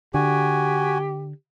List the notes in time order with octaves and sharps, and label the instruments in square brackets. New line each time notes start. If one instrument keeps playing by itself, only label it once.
[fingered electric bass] D3 [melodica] F#4 G#5 [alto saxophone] G4